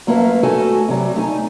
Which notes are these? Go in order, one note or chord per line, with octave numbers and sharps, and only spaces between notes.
F#2 A3 A#3 A#4 B4 F5
A3 F#4 A4 G#5
C3 F#3 G3
A3 D#4 G#5